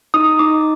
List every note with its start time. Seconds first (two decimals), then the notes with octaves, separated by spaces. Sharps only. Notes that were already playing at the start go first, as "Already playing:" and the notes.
0.14 D#4 D#6
0.39 D#4 D6